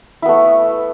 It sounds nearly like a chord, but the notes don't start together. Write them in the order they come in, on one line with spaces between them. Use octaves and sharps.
E4 B3 A3